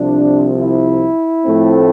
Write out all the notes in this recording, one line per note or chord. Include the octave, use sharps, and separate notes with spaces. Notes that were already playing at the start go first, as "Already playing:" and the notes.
Already playing: C2 C3 F3 D4
E4
A2 F3 A3 C4